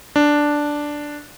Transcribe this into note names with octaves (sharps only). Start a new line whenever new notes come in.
D4